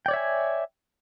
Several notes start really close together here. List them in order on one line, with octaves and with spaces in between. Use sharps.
G5 D5 C#5 E5 G#5